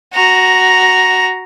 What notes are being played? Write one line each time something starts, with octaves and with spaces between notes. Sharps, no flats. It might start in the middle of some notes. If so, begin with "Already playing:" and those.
F#4 A#5